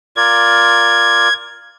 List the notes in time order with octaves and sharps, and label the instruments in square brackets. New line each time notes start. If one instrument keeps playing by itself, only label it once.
[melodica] F4 A#4 D5 [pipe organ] G#6